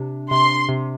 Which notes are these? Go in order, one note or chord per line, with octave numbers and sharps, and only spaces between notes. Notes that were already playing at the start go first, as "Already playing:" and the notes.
Already playing: C3 D4
C3 C6
C3